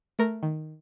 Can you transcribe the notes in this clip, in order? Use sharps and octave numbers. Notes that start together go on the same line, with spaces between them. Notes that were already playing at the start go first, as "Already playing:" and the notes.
A3 A#4
D#3